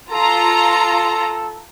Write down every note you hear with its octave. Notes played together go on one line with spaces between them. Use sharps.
F4 A4 A#5